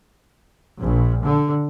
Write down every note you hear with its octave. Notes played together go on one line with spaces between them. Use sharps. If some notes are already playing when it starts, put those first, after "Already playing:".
A#1
D3